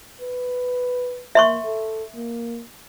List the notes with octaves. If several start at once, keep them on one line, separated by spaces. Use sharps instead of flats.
B4
A#3 E5 C6 C#6
A4
A#3